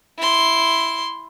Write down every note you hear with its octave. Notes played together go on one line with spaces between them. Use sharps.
E4 C6